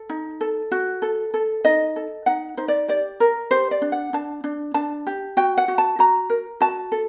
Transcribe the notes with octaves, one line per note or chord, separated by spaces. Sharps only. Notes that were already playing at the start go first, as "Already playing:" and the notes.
Already playing: A4
D#4
A4
F#4
A4
A4
D#4 D#5
A4
D#4 F#5
D#4 C5
D5
G4 D5
A#4
G4 C5
D5
D4
F#5
D4 A5
D4
D4 A5
G4
F#4 G5
F#5
F#4
A5
F#4 A#5
A#4
F#4 A5
A4